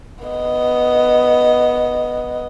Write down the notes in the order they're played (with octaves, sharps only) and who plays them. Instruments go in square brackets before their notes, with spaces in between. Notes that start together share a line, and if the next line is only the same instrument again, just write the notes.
[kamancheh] B3 D#5